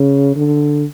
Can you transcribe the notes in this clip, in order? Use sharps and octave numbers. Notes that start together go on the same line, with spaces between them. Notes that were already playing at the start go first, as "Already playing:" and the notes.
Already playing: C#3
D3